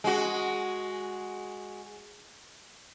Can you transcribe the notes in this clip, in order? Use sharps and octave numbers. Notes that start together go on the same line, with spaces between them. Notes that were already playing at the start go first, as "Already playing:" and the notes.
G#3 F#4